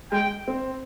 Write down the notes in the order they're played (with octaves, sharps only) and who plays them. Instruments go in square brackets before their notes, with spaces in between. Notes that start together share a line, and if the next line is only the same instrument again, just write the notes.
[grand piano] G#3 [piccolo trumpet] G5
[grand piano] C4